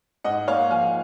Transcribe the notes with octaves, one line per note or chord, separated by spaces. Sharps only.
G#2 D#5 F#5
A#3 C#5 F5
F3 F5 G#5